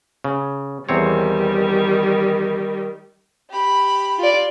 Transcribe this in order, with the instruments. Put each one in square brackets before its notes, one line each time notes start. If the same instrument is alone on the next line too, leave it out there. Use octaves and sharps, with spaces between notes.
[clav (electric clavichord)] C#3
[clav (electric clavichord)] E2 C4 C#5 [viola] D#3 G3
[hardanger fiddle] G4 B5
[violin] F4 D5